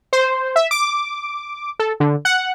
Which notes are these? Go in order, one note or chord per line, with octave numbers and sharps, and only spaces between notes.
C5
E5
D6
A4
D3
F#5